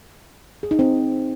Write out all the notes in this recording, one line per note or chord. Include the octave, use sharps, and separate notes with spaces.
G#4
D#4
C4